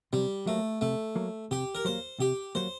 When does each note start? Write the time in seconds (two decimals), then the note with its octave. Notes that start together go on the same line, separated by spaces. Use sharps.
0.13 C3 G3
0.47 F#3 A3 A#3
0.81 C3 A3
1.16 F#3 A#3
1.51 C3 G4
1.75 A#4
1.85 F#3 A#3 C5
2.20 C3 G4
2.55 F#3 A#3 C5